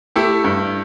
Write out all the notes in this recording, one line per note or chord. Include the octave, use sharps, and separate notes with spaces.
A3 E4 G4
G2